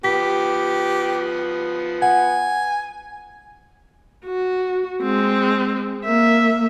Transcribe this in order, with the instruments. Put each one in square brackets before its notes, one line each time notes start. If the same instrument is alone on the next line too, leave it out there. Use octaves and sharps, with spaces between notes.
[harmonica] F3 B3 [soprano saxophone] G4 [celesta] B6
[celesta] F#5 [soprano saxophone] G#5
[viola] F#4
G#3 C4
A#3 E5